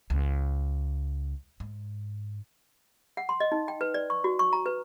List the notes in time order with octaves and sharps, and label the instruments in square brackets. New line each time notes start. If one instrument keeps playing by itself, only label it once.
[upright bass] C#2
G#2
[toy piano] F#5
C6
D#5
D#4
G5
B4
D5
C#6
F#4
C#6
A#5
B4